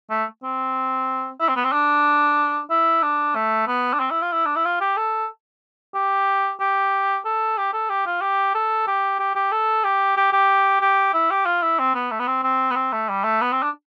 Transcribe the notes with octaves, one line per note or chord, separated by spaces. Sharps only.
A3
C4
E4
C4
B3
C4
D4
E4
D4
A3
B3
D4
C4
E4
F4
E4
D4
E4
F4
G4
A4
G4
G4
A4
G4
A4
G4
F4
G4
A4
G4
G4
G4
A4
G4
G4
G4
G4
E4
G4
F4
E4
C4
B3
A3
B3
C4
C4
B3
C4
A3
G3
A3
B3
C4
D4